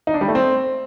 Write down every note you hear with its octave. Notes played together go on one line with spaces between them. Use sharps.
D#4
D4
G3
A3
C4